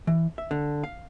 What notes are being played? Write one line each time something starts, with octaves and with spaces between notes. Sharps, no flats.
E3
E5
D3
F5